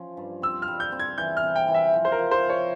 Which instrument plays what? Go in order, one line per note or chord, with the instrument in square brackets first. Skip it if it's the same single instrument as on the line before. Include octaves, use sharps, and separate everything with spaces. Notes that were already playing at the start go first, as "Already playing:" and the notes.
Already playing: [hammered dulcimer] F3 C#4
G2
[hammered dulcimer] C4 [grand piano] E6
[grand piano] F6
[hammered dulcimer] G3
[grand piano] G6
[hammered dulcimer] C4
[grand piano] G#6
[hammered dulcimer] E3 [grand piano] G6
[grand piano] F6
[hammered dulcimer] C3
[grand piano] G5
[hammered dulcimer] E3
[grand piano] E5
[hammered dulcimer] F3
[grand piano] C5
A#4
[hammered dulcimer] F3
[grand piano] C5
[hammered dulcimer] E4
[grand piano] C#5